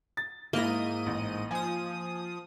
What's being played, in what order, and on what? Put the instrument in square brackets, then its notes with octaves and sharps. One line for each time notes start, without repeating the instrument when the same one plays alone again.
[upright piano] A6
[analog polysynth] G#2 D#5 D#7 [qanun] A#3 [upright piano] E4 G7
[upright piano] A1
[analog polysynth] F3 D#6 [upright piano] G#5